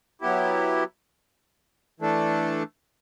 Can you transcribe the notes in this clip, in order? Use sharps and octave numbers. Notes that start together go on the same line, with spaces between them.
F#3 B3 E4 G4
E3 A3 D4 A4